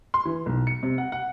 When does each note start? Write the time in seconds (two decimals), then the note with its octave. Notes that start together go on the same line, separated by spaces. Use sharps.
0.14 C6
0.25 E3
0.46 B1
0.67 C#7
0.83 C3
0.98 F#5
1.12 F#5